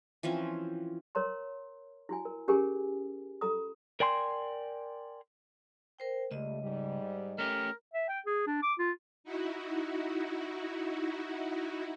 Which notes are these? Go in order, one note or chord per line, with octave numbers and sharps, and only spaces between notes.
E3 F3 C4 C#4
A#4 C#5 A#5 C6
E4 F#4 G#5
A#4
C#4 G4 G#4 A#4 G#5
F4 A4 A#5 D#6
A#4 D5 G5 G#5 C6
A#4 C5 G5
C#2 G3 A3 D#5
G#2 G3
A3 C#4 G4 A#4
E5
G5
G#4
D4
D6
F4
D#4 E4 F#4